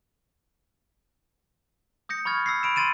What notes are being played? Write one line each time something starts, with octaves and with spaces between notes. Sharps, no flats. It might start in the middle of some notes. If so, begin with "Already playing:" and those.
D#6 G6 A#6 C#7
B5 C#6 F6 G#6 A6
E6 A#6 C7
B5 D7 E7
C6 A6 D#7 E7